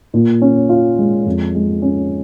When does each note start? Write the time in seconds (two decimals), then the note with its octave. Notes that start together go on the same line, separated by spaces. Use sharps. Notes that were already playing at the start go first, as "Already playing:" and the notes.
0.14 A#2
0.42 C#4
0.69 F4
0.99 G#3
1.26 F2
1.55 G#3
1.82 C#4